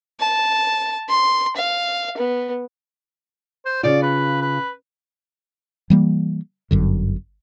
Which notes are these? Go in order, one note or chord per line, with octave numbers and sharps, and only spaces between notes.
A5
C6
F5
B3
C5
C#3 F4 D5
B4
B4
E3 G3 A#3
G1 F#2 D3